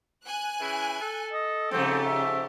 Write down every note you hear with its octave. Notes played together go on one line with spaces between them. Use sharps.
G#5 F#6
C#3 E3 E4
A4
D#5
G#2 C#3 F3 A3 C4 G4
E5